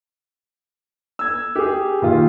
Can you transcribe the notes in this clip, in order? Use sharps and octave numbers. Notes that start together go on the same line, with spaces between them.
E6 G#6
G4 G#4
A#2 D#3 F4